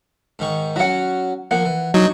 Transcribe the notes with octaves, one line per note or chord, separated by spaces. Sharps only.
G#2 D#3 C#6
F#3 C#4 F#4 F#5
F3 A#3 F#5
E3
F#3 D4 D#4 C#6